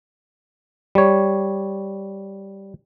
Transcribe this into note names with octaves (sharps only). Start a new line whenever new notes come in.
G3 C#5